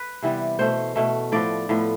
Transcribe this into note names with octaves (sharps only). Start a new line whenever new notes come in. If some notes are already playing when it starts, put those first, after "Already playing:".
Already playing: B4
C3 E3 G3 B3
B2 A3 C5
B2 A3
A2 F3 B3 D5
A2 F3 B3